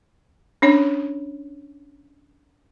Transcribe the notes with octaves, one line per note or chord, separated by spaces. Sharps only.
C#4 D4 C#5